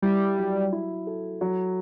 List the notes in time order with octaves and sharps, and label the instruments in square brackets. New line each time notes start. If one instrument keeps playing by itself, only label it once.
[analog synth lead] G3 [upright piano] E4
[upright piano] F#3
E4
A4
F#3